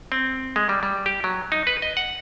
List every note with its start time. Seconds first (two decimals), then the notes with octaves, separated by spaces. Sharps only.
0.12 C4
0.56 G#3
0.69 G3
0.83 G3
1.06 G4
1.24 F#3
1.52 D#4
1.67 B4
1.82 D#5
1.97 F#5